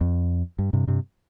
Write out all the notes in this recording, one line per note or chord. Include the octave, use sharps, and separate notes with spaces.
F2
G2
G2 C3
G2 C3